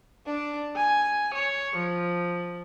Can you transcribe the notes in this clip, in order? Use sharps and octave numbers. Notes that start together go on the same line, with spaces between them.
D4
G#5
C#5
F3